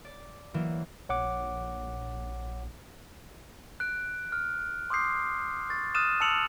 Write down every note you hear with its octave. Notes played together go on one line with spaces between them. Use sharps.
D5
E3 F#3 A#3
A#1 C#5 F#5 D6
F#6 D7
F6
C6 D6 D#6 G6 C7
C#6 A6
D#6 F6 F#6 A6 D#7 E7
A5 D#6 E6 C#7 F7 F#7